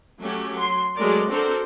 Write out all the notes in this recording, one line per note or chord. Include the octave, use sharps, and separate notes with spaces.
F#3 A3 C#4 G4
F#3 C6
F#3 G#3 A3 A#4 D5
C4 D4 F#4 A4 A#4 C5